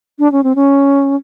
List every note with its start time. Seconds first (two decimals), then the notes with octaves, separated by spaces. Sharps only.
0.19 D4
0.32 C#4
0.43 C4
0.55 C#4